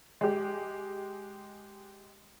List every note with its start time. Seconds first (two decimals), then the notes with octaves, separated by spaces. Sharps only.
0.21 G#3 G4